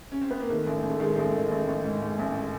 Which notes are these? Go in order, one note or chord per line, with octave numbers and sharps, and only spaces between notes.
C#4
C4
B3
A#3
D#3 A3
A1
A1
A3
D#3 G#3
A1 G#3
A3
D#3
A1
A1
G#2
G#2
A1